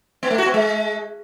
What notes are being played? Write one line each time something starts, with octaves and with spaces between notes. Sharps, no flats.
B3
A3
F#4
B3
G#3